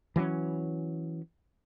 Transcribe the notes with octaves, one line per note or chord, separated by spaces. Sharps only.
E3 F#3 C4 C#4